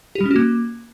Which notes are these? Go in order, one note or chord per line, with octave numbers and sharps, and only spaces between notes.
G4
G3
C#4
F#4
A#3